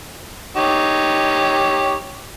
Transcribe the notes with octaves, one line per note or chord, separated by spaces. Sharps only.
D#4 G4 C#5